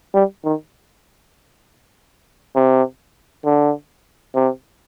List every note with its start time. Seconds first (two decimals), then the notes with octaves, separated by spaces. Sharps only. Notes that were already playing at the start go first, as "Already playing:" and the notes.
0.14 G3
0.45 D#3
2.55 C3
3.45 D3
4.35 C3